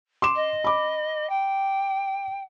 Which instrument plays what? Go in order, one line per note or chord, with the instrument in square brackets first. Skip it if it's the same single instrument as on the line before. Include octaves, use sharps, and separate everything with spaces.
[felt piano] C6 D6 E7
[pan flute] D#5
[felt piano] B5 D6
[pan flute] G5